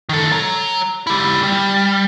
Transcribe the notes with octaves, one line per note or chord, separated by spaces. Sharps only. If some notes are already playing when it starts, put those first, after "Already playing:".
D#3 A4
C#5 A#5
E4 G4
G3